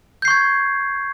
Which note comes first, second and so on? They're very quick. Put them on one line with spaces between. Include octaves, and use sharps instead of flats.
G6 C7 C#6 G#6